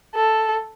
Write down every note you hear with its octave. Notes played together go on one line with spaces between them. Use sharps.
A4